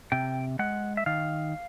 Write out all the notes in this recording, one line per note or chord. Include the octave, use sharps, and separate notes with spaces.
C3 G5
G#3 F#5
E5
D#3 F5